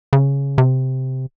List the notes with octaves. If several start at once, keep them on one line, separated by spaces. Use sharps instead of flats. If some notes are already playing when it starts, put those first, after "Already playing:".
C#3
C3